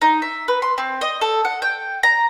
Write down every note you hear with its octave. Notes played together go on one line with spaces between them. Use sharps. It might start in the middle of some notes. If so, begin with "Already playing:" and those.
D#4
E5
B4
C6
C4
D#5
A4
F#5
G5
A#5